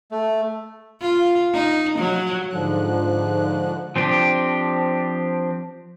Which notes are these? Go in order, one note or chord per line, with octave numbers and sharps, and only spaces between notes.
A3
F4
D#4
F#3
G#2 D3 F3 F#6
F3 C4 D4 G4